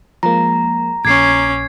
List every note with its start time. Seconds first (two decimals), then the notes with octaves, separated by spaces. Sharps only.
0.23 F3 G#3 A#3 A#5
1.05 A#1 A#2 C#4 D6 G#6 C7